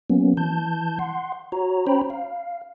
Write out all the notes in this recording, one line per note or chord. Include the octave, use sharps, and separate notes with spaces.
F#3 A#3 B3 C#4
E3 A5 G6
F#5 C6
F#4 C#5 A#5
C#4 C5 C#5 G5 A#5 B5
F5